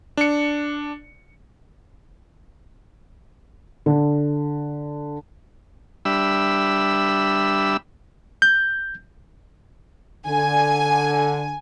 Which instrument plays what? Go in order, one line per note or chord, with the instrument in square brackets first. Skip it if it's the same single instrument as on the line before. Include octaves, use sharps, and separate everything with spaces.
[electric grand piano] D4 C#7
[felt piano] D3
[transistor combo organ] G3 D4 E5 B5 E6
[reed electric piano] G6
[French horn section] D3 [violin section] G#5